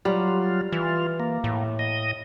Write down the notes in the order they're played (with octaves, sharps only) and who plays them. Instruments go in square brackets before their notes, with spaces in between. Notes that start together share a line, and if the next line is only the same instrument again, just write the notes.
[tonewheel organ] F#3 F4 [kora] G3
[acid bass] E3 [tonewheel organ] F4
[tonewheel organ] A#3
[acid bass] A2
[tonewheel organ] D#5